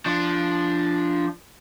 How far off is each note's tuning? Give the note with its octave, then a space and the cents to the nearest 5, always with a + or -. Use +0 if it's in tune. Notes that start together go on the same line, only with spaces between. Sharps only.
F3 -10 D4 +0